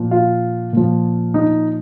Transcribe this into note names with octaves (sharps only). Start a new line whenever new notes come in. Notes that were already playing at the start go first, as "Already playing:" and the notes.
Already playing: A#2 F3
F4
A#2 F3
D#4